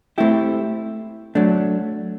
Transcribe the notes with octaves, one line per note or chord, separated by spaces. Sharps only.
A3 C4 E4 G4
F#3 A3 D4